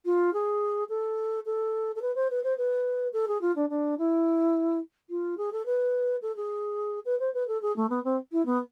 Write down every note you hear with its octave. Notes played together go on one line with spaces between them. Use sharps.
F4
G#4
A4
A4
A4
B4
C5
B4
C5
B4
A4
G#4
F4
D4
D4
E4
F4
G#4
A4
B4
A4
G#4
B4
C5
B4
A4
G#4
A3
B3
C4
E4
B3